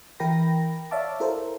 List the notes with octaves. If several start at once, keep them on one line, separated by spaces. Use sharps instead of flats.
E3 E4 A#4 G5 B5 A#6
C#5 D5 E5 F5 A5 D6
E4 A4 A#4 C5